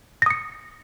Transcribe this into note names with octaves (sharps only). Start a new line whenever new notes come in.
D#6 A#6 C#7